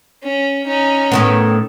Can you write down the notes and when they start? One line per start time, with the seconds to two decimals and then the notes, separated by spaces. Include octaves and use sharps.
0.24 C#4
0.67 C#4 D#4
1.12 A2 D#3 B3